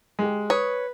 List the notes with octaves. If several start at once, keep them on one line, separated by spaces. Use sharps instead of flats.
G#3 G4
B4 C#5 D#6